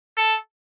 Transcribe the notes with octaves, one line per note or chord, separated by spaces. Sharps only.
A4